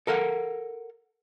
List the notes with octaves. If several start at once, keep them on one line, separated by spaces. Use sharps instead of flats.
A4 A#4 F5 F#5